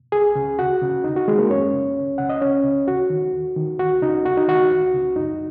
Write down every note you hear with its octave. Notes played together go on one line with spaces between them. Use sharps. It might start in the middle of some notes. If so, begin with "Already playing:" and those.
C#2 G#4 G#5
C#3
D#2 F#4 F#5
C#3
D#2 D#4
F#4
D#3 G#3 G#4
A#3 A#4
F#2 C#4 C#5
C#3
C#2
C#3 F#5
D#5
C#2 C#4 C#5
C#3
D#2 F#4
D#3
D#2
D#3
C#2 F#4
C#3 D#4
D#2 F#4
D#4
D#3 F#4
C#2
C#3
F#2 D#4